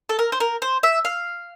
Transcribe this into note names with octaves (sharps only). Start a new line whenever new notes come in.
A4
A#4
C5
A#4
C5
E5
F5